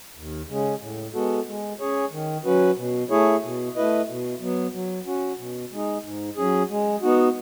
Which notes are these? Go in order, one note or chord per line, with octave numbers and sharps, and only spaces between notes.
D#2
C#3 G#3 C#4
A2
G#3 B3 F#4 A4
G#3
C#4 G#4 C#5
D#3
F#3 C#4 F#4 B4
B2
A3 E4 G#4 C#5
B2
A3 E4 B4 D#5
B2
F#3 B3
F#3
C#4 F#4
B2
G#3 D#4
G#2
F#3 C#4 G#4
G#3
B3 D#4 F#4